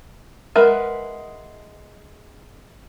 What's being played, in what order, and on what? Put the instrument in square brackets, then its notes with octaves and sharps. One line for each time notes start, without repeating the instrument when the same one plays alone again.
[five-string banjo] G#3 A#4 B4 E5 F#5